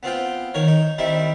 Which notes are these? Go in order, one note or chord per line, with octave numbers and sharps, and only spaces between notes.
B3 C4 F4 G5
D#3 A#4 C#5
D#4
D#3 G3 C4 D#4 E4